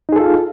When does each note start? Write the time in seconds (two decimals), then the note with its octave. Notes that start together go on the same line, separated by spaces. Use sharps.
0.09 D#4
0.12 G#4
0.16 A4
0.20 F4
0.24 F5